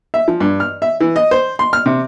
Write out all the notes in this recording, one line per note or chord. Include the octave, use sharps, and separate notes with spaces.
E5
F3
G2
F6
E5
E3
D#5
C5
C6
F6
C3